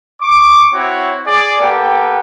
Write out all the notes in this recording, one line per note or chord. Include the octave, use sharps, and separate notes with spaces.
C#6 D6
C4 E4 F#4 C#5
G#4 D5
A#3 B3 G4 A4 G5